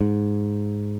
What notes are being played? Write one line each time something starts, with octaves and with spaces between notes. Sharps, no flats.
G#2